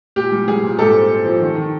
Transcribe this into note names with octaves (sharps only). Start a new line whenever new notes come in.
A#2 G4
G3
G3 G#4
A#2
G#2 G4 A4
C4
C4
F3
D#3
D#3